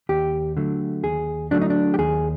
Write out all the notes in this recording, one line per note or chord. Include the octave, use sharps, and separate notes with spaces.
D#2 G4
D3 F#3 A3
D#2 G#4
D3 F#3 A3 D4
D#4
D4
G4
D#2 G#4